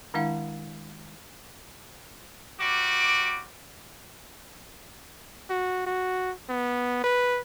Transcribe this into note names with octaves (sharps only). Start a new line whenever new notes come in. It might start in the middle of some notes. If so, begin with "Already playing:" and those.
D#3 G#3 D4 E4 F5 F#5
G3 F#4 D6
F#4
F#4
B3
B4